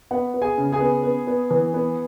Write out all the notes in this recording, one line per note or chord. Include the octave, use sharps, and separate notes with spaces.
B3 F#5
B3
G#4 G#5
C#3
G#4 G#5
B3
B3
B3
E3
B3